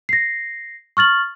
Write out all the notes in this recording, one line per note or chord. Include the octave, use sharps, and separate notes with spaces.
A#6 C7
C#6 F6 A6 F#7